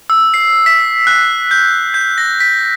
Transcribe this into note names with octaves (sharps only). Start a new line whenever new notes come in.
E6
C7
B6
F#6
G6
G6
A#6
B6